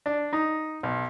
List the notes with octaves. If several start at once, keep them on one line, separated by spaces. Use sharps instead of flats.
D4
D#4
B1